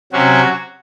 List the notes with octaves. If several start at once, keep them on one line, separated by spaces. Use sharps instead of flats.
C3 F#3 C#4 F#4